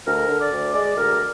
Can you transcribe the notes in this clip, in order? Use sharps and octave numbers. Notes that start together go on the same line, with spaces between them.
D2 A#4
D3
D5
D2
G#3 D5
D2 A#4